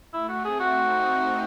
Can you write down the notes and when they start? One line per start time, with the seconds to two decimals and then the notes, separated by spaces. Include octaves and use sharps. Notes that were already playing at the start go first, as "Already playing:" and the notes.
0.13 A3 E4
0.29 F#4
0.44 C4 G#4
0.60 F#4
0.75 D#4